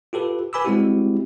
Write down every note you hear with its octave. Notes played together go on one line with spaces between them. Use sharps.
F4 G4 A4 B4
B4 G#5 B5 D6 E6
G3 G#3 C4 E4 F#4 G4